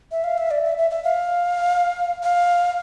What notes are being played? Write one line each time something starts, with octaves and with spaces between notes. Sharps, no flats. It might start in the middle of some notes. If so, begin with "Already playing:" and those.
E5
F5
E5
D5
E5
E5
E5
F5
F5